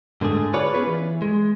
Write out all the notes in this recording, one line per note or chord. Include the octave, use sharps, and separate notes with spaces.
G#2 D3 A3 G#4
F4 G#4 B4 C#5 D5
B3 C#4 G#4 B4
E3
G#3